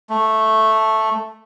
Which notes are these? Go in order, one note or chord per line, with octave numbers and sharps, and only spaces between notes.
A3